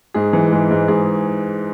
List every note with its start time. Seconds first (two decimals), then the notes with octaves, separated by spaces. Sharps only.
0.14 G#2 G#4
0.33 E3
0.52 G#2
0.71 G#2
0.88 G#2 G#4